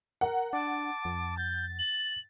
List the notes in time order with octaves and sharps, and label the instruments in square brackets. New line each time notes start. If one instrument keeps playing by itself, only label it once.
[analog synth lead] A#4 [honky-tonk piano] F#5
[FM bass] D4 [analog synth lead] A5 [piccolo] D6
[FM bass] F2
[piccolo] G6 [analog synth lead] A6
[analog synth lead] A6 [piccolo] F#7